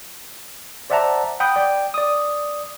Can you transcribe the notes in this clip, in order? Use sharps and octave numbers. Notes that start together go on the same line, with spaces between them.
C5 D5 E5 F#5 A5 A#5
F#5 G5 B5 D#6 G6
D5 G5
D5 D#6